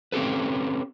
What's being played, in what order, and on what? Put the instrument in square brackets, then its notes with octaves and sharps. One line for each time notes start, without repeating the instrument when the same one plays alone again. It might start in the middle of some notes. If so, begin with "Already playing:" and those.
[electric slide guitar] C4 C#4 G4 A4 B4